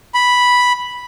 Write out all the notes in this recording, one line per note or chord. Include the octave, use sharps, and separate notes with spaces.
B5